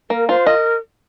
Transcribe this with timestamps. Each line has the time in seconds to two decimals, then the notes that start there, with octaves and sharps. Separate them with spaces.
0.10 A#3 A#4
0.28 F4 C5
0.46 A#4 D#5